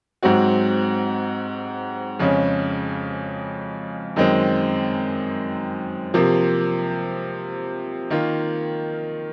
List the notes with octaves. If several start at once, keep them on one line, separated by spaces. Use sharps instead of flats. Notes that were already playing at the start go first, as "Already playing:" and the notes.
G#2 F#3 C4 F#4
F2 C#3 G#3 C#4
F#2 D#3 G#3 C4
C3 F3 A#3
D#3 A#3 F4